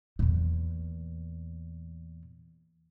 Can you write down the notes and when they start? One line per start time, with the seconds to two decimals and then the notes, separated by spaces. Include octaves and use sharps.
0.19 E2 A#2